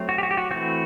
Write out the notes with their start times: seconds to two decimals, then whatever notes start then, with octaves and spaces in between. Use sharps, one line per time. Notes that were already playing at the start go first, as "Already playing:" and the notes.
Already playing: F#3 A3 C4
0.09 F#4
0.18 G4
0.23 F#4
0.31 G4
0.37 F#4
0.51 E3 A3 C4 F#4